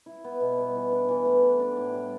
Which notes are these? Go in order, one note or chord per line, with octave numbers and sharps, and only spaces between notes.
E4
B3
B2
G3
E3
D4
E3
A3
F#4
D4
A2
G3